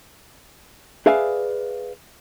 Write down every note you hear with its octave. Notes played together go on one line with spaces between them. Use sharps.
G#4 B4 D5 E5 F5 G#5